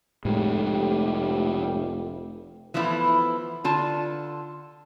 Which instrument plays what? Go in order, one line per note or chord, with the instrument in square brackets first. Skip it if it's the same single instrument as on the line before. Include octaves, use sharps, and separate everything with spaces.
[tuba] F1 [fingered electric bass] A2 G#3 [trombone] G4
[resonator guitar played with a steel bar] E3 F3 A3 B3 E4
D3 F4 A5